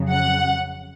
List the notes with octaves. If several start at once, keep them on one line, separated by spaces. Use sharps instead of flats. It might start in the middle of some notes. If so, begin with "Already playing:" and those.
Already playing: F2 C#3 F#3
F#5